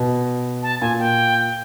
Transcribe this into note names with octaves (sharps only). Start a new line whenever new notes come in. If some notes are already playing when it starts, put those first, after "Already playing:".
Already playing: B2
A5
A#2 G#5
G5